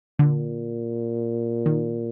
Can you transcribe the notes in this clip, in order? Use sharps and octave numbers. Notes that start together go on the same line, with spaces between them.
A#2 D3
D#3